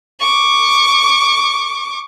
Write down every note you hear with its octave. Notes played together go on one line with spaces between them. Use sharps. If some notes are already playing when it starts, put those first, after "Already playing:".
C#6 D6